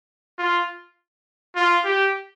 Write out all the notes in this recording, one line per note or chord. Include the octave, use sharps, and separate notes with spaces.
F4
F4
G4